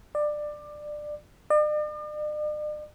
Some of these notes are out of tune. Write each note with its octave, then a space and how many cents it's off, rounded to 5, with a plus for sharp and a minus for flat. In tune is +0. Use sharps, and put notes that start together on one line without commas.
D5 +20
D5 +45